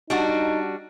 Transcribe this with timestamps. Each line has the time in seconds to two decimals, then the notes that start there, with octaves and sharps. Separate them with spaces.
0.10 G3 D4 D#4 F#4